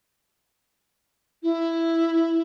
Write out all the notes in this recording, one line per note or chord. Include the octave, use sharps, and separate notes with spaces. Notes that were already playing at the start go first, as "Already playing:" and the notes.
E4